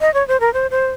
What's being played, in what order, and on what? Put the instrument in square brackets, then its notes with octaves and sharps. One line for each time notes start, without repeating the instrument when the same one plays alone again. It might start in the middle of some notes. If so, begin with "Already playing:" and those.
[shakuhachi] D#5
C#5
C5
A#4
C5
C5